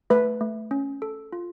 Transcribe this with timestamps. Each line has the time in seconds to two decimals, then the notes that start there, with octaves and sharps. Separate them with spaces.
0.10 A3 B4
0.41 A3
0.71 C#4
1.02 A4
1.33 F4